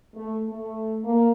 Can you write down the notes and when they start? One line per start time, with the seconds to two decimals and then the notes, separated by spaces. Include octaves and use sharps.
0.14 A3
0.49 A3
1.03 A#3